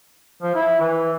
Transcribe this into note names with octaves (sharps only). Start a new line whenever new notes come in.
F3
E4
E3